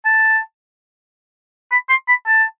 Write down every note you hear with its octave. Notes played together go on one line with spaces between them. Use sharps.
A5
B5
C6
B5
A5